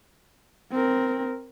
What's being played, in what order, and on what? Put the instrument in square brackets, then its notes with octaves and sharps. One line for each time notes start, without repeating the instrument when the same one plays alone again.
[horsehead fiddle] C4 A#4